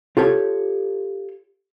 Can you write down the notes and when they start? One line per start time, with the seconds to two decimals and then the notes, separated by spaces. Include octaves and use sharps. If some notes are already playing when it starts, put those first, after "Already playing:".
0.17 F4 G4 A4 C#5